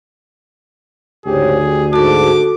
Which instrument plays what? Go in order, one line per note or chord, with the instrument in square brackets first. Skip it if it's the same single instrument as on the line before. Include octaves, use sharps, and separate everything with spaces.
[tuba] D2 [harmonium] G#2 C#3 G4 [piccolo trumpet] G#4
[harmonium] G4
[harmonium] G#2 A5 [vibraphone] F#4 A4 [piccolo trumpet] D6